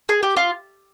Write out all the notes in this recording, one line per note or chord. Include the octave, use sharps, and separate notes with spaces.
G#4
G4
F4